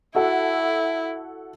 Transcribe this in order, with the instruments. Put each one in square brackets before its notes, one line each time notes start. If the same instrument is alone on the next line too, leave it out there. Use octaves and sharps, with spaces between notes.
[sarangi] E4 [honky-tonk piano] F#4 A4 F#5